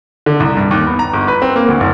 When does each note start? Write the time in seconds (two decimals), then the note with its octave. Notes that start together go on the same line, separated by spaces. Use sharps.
0.26 D3
0.40 C2
0.57 G2
0.71 D#2
0.87 B3
0.99 A#5
1.14 G1
1.28 B4
1.42 C4
1.56 A#3
1.68 D2
1.80 F#1